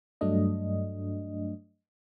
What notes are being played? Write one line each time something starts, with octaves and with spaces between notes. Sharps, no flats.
G2 F#3 A3 D4 D#5